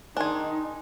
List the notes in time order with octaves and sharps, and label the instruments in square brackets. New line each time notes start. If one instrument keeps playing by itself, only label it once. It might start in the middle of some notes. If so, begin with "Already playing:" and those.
[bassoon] D#3 [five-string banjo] D4 G#4 [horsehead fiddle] D#4 [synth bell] G#5 C6